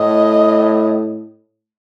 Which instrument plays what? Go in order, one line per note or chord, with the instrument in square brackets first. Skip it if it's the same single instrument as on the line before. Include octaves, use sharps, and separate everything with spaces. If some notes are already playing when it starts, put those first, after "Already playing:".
Already playing: [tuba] A2 [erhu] D#5